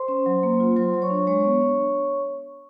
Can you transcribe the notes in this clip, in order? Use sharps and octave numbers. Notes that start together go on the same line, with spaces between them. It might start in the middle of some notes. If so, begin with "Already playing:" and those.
Already playing: C5 C6
C#4
F#3
A#3
F4
F#3 C5 C6
F#3
C#5 C#6
D4
G#3 C#5 C#6
B3
D4